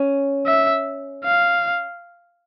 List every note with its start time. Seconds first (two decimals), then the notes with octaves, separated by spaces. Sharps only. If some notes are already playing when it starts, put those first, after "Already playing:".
Already playing: C#4
0.46 E5
1.24 F5